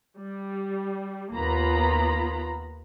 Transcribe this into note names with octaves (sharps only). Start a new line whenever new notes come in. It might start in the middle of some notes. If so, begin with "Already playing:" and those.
G3
D#2 A#3 B3 F4 A#5 B5